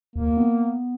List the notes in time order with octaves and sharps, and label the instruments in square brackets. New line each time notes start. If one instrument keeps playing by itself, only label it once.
[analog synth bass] D#2 [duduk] A#3
[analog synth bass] B3